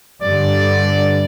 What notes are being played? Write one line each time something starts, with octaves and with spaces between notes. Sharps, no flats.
G2 D3 D5